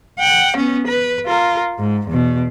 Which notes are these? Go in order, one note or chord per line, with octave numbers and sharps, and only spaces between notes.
F#5 G5
B3 C#4
B4
F4 A#4
G#2
E2 B2